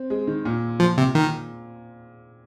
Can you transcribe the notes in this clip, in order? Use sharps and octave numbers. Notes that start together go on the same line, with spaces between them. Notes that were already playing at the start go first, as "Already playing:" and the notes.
Already playing: C4
G#3
D#3
A#2
F3
C3
D#3